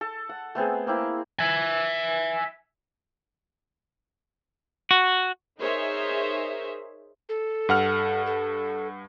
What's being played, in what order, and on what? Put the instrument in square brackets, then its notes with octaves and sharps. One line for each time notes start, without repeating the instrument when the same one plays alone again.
[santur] A4 A5
F#5
A3 B3 C4 G#4
A#3 C4 E4
[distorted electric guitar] E5 G#5
[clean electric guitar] F#4
[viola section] D#4 G#4 A#4 C5 C#5 E5
[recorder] A4
[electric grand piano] G2 F#5 F6
[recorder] A4